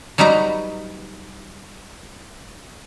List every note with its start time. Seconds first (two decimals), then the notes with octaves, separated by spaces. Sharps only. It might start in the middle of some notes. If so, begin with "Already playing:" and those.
0.18 F#3 G3 D#4 B4 A#5